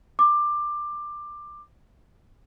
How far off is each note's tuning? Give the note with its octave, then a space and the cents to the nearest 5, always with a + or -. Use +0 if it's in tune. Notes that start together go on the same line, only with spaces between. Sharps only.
D6 +15